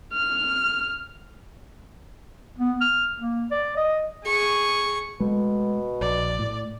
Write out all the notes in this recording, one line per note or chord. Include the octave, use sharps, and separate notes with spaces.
F6
B3
F6
A#3
D5
D#5
G#4 C#6
B2 G#3 A3
A#1 D5
A2